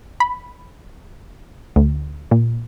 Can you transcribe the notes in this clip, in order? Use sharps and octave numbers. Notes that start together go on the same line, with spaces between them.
B5
D2
A#2